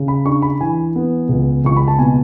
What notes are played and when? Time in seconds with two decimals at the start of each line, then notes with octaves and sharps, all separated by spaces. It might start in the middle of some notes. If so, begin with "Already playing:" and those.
Already playing: C#3
0.08 B5
0.26 D4 C#6
0.42 B5
0.60 E3 G#5
0.96 B3
1.29 C#2
1.65 C#2 C#6
1.77 B5
1.88 A5
1.99 B2 G#5